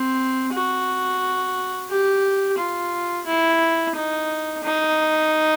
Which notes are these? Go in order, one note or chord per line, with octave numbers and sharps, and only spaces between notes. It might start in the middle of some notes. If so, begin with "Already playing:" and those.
Already playing: C4
F#4
G4
F4
E4
D#4
D#4